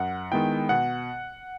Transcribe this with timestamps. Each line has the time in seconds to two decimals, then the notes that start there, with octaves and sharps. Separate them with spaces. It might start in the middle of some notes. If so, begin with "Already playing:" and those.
Already playing: F#2 F#5
0.32 D#3 G#3 B3 E4 G5
0.69 B2 F#5